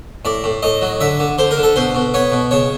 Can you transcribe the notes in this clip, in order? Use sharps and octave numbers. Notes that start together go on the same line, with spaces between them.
A2 D5
A2
A2 D#5
F#3
D3 E5
D3
D3 C5
A#4
D3
A4
B2 C5
B2
B3 C#5
B2
C#3 C#5